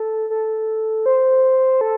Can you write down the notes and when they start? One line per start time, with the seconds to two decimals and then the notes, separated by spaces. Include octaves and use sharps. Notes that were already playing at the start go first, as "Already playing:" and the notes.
Already playing: A4
0.30 A4
1.06 C5
1.81 A4